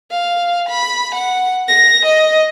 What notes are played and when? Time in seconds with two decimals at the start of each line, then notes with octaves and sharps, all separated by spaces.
0.11 F5
0.69 B5
1.15 F#5
1.68 A#6
2.06 D#5